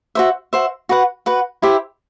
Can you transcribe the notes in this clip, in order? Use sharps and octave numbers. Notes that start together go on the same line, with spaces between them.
F#4 C5 E5
F#4 C5 E5
F#4 B4 F#5
F#4 B4 F#5
E4 G4 C5 E5